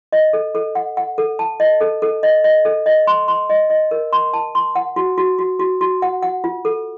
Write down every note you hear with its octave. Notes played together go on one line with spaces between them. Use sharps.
D#5
A4
A4
F#5
F#5
A4
A5
D#5
A4
A4
D#5
D#5
A4
D#5
C6
C6
D#5
D#5
A#4
C6
A5
C6
F#5
F#4
F#4
F#4
F#4
F#4
F#5
F#5
F4
A4